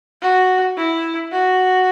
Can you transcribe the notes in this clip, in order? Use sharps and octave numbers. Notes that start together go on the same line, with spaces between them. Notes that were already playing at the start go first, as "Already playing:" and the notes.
F#4
E4
F#4